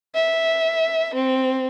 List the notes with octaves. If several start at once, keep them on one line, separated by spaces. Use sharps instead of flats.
E5
C4